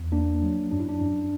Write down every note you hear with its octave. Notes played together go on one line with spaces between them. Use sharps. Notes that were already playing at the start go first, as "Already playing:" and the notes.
Already playing: E2
A#3 D4
F#3
F#2 D4
E4
D4
F#2